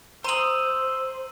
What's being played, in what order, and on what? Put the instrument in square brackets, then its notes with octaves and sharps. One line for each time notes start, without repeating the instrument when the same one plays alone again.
[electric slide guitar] C5 [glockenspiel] A#5 D#7 F#7 [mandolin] C6 D#6 [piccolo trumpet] E6